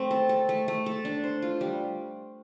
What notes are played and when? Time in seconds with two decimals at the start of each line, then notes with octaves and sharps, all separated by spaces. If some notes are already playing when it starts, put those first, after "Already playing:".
Already playing: A3 C4
0.11 A4
0.29 A4
0.49 A3
0.68 A3
0.86 A4
1.05 D4
1.23 C5
1.42 F4
1.61 G3